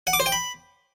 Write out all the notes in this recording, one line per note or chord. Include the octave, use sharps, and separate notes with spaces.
F#5
D6
C5
G5
B5